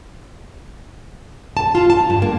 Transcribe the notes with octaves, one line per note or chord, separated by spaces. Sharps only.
A5
F4
A5
G2
A#3